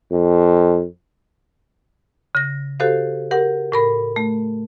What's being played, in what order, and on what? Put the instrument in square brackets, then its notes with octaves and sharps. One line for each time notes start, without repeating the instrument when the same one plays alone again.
[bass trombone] F2
[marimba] C#3 A#6
F#4 G4 A4 C5 F5
G4 A#4 F#5
A2 A#4 B5
A3